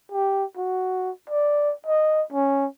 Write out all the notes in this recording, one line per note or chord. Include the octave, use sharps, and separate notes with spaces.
G4
F#4
D5
D#5
C#4